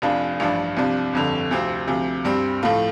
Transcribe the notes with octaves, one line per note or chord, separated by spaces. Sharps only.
F1 F2 F3 D4 F4
A1 G2 F3 D4
C2 C3 F3 D4
G1 F2 D3
D2 C3 F3 C4
D2 C3 F3
G2 G3 C4
A2 F3 A3 F4